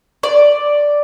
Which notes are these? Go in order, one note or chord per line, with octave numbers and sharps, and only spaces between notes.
D5